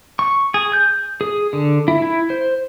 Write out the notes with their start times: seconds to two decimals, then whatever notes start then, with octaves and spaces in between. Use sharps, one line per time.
0.19 C#6
0.54 G#4
0.73 G6
1.21 G#4
1.53 D3
1.88 E4
2.02 E4
2.30 C5